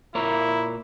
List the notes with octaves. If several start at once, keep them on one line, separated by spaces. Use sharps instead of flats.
A#2 E4 A#4 C#5